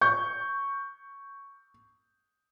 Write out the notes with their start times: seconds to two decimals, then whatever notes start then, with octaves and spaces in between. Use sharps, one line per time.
0.01 C#6 G6